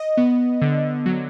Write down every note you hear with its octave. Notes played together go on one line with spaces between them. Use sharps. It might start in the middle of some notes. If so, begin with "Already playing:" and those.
Already playing: D#5
B3
D3
F#3